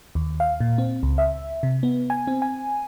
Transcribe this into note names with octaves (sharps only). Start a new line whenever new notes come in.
D#2
F5
A#2
C4
C#2
E5
C3
B3
G#5
C4
G#5